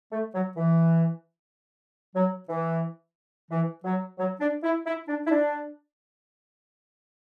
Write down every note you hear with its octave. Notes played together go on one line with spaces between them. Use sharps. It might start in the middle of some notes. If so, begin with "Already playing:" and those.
A3
F#3
E3
F#3
E3
E3
F#3
F#3
D4
E4
E4
D4
E4
D4